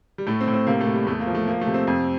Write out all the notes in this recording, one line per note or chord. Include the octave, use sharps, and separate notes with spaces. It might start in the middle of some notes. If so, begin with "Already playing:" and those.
G3
A2 A3
C4
A2
C4
C3 A#3
A3
C3
G3
E2 A3
A#3
F3
A3
F3 A#3
A3
C3
C4
F2